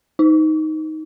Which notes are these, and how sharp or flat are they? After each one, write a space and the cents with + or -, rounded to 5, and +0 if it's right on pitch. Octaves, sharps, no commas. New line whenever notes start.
D#4 +10